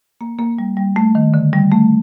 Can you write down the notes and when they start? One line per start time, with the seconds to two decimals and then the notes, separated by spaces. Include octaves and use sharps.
0.21 A#3
0.39 A#3
0.59 G3
0.77 G3
0.96 A3
1.15 D#3
1.34 D3
1.53 G3
1.71 A3